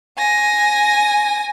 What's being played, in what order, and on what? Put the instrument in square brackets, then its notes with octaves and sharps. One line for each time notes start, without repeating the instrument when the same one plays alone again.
[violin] G#5 A#6